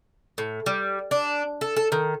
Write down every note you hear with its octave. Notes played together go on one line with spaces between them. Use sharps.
A2
G3
D4
A4
A4
D#3